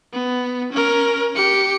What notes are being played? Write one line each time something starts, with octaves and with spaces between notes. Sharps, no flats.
B3
C#4 A#4
G4 C#7